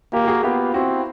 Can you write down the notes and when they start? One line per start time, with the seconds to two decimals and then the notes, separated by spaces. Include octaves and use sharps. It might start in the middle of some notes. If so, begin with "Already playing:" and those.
0.13 A#3 F4 G4
0.24 G4
0.28 F#4 G#4
0.43 B3 F4 G4
0.74 C4 E4 F#4